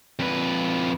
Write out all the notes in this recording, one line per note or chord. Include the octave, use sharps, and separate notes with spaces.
F2 B4